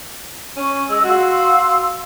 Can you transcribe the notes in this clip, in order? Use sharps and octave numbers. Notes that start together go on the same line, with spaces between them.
C#4 C#6
G#3 D#5 D#6 E6
F#4 F5 C6 E6